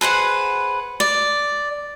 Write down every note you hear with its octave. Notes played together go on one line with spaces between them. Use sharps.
G#4 B4 C5 F#5
D5